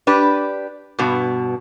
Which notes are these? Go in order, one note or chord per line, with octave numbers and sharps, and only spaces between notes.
D4 G4 B4
G2 B2